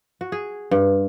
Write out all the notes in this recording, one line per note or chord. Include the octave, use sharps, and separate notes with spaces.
F#4
G#4
G2